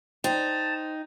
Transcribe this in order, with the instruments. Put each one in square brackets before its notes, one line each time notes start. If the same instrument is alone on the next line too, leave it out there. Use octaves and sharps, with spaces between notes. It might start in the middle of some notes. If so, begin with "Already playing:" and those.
[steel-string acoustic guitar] D#4 [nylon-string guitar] C5 [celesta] G5 [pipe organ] A5